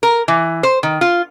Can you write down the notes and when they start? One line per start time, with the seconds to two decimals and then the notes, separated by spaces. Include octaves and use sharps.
0.03 A#4
0.28 E3
0.63 C5
0.83 D#3
1.01 F4